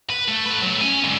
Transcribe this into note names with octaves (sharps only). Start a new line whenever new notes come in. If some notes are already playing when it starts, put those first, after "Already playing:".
B4
A3
A3 B4
F#3 A3
C#4 G#5
G#2 D3